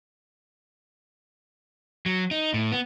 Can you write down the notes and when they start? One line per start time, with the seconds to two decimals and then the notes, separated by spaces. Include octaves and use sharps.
2.06 F#3
2.31 D#4
2.54 A2
2.72 B3